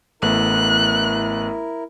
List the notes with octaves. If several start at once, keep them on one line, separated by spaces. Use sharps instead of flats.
A1 A3 B3 E4 A#4 F#6